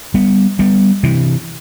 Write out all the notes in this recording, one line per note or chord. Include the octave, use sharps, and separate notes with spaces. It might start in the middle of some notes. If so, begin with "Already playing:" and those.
G3 B3
G3 B3
C3 E3